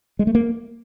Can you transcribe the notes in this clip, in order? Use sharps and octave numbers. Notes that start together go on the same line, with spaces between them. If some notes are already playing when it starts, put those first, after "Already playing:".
G#3
A3
A#3